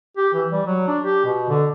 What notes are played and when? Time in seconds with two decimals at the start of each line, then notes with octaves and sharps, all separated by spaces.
0.17 G4
0.34 E3
0.52 G3
0.66 F#3
0.88 D4
1.04 G4
1.25 B2
1.49 D3